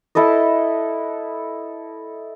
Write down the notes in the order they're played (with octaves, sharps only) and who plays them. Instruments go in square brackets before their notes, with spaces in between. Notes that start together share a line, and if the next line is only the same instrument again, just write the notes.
[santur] E4 A4 B4 D#5